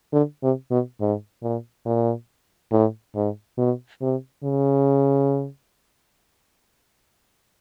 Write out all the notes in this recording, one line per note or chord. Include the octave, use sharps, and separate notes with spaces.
D3
C3
B2
G#2
A#2
A#2
A2
G#2
B2
C3
C#3